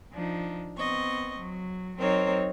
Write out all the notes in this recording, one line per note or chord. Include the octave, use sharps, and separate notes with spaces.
F3 D4 D#4
B3 C4 D#5 C#6
F#3
F#3 C4 D#4 A#4 C5 C#5